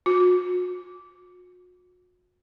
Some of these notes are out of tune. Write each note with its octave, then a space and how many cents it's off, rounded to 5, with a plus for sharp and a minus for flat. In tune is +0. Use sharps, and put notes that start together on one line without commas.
F#4 -45